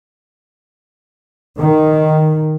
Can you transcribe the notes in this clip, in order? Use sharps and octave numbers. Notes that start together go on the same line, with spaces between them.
D#3